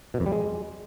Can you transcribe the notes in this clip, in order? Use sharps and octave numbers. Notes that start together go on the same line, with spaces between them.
B2
F2
G3
G#3